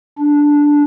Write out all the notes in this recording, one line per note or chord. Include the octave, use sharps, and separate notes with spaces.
D4